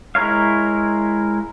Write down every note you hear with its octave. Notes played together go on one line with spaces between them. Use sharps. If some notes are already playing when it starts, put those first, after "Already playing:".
G#3 E4 A#4 C#5 F5